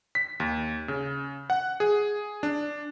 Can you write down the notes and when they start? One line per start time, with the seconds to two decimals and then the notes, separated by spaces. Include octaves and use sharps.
0.15 B6
0.40 D#2
0.88 C#3
1.50 F#5
1.80 G#4
2.43 D4